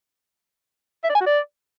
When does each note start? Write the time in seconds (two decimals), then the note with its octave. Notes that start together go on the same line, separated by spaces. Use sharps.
1.04 E5
1.10 D5
1.15 G#5
1.21 F#4
1.26 D5